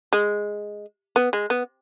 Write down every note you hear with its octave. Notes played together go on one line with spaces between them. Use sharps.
G#3
B3
G#3
B3